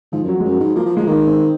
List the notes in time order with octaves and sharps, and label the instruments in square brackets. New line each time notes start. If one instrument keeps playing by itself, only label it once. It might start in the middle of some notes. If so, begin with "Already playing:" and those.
[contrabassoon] G#2 [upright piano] F3
[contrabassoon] F#2
[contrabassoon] F2 [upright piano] F#3
[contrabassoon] F#2 [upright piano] G#3
[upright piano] F#3
[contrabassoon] G#2
[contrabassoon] F3 [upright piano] A#3
[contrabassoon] F3
[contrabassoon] F3 [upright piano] G#3
[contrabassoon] D#3 [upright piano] A#3
[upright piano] C4